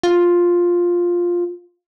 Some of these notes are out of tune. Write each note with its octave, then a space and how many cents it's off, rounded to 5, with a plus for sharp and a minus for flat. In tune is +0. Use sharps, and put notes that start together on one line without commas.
F4 +5